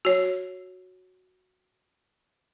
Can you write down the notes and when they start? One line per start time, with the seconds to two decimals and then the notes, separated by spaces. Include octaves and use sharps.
0.05 F#4 C#5